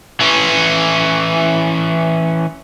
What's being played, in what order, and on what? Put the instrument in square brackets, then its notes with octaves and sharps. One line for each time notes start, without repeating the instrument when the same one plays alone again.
[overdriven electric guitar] E3 C#4